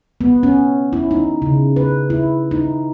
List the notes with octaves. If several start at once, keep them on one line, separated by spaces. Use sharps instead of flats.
B3
C#4
E4
D#4
C#3
B4
E4
D#4